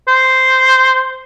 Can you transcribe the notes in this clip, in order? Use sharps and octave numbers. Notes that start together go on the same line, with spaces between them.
C5